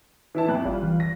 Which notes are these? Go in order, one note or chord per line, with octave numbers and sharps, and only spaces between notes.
E3 E4 A5
B1 F2 F#6
G#1 G3 F4
E3
A#6